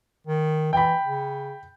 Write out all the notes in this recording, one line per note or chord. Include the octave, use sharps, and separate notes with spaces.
D#3
E3 G5 B5
C#3